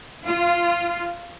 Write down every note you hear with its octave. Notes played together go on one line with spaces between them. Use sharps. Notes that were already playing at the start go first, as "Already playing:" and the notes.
F4